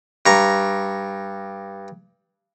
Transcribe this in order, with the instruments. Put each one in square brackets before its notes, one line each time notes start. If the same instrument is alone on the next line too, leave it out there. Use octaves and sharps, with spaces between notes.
[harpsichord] G2 A#5 C#6